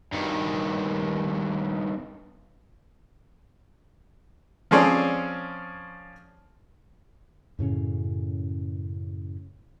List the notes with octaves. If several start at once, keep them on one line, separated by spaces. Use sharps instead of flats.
G2 D#3
F3 C4 C#4 G#4 C#5 D5
F#2 A2 C#3 C#4